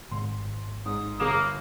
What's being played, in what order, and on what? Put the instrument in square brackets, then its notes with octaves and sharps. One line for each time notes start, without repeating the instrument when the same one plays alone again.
[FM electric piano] G#1 [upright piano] C6
[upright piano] G#2 [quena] D#6
[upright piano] G1 E7 [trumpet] A#3